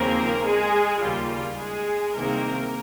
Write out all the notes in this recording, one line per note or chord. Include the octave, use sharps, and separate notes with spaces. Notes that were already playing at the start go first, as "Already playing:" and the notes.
Already playing: D#2 C#3 F3 A#3 C4 A#4
G#3 G#4
D#2 C#3 G3 A#3 F4
G#3 G#4
C2 C3 D#3 G#3 A#3 C4 A#4